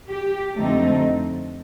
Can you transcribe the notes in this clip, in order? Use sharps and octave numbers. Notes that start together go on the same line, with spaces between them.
G4
F2 D3 A3 C4 D#4